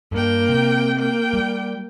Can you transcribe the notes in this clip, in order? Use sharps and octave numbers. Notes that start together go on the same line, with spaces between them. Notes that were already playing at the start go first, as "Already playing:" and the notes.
G2 A#3 G5
C3
A#3 G5
G3